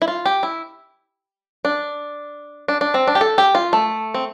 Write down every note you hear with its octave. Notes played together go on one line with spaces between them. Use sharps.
E4
F4
G4
E4
D4
D4
D4
C4
D4
G4
A4
G4
F4
A3
C4